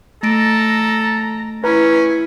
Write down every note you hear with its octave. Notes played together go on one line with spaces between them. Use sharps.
A3 A4 A#5 A#6 D7
C#4 E4 B4 A#5